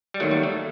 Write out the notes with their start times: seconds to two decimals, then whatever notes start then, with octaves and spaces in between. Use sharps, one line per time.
0.14 G3
0.20 D#2 D#3 F#3 A3
0.31 G3
0.43 A3